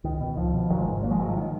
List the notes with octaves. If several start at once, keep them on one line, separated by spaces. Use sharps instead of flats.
C#2 D#3
B2
C#2 F3
B2
G#1 D#3 F#3
F3 G#3
G#2
G#1 F#3 A#3
F3 G#3
G#2 D#3 F#3
F3
D#3